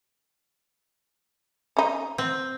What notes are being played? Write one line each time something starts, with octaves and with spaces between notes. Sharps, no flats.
C#4 D#4
C4